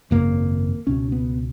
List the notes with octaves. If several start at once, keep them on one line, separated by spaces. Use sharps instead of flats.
G#1 F#2 C#3 A#3
C#2 B2 C#4
B3